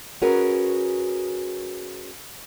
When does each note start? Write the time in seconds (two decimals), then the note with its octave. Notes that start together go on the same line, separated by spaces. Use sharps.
0.22 C#4 F#4 G#4 A#4 B4